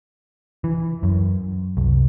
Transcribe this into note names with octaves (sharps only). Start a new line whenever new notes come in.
E3
F#2
C2